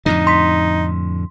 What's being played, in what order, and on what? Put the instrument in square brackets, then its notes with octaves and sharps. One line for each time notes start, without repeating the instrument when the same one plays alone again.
[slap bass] F2 A2 D3 [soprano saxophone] D#4
[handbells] C6 B6